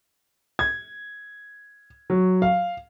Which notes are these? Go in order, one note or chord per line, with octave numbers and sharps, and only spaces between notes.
G#6
F#3
F5